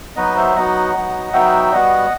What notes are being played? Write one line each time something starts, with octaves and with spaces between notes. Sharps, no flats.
F#3 B3 D#4 F#4 B4 D#5
C5 E5
F#3 B3 D#4 F#4 D#5 F#5
F#3 B3 D#4 F#4
F#3 B3 D#4 F#4 E5 G5
G3 B3 F#4 D#5 F#5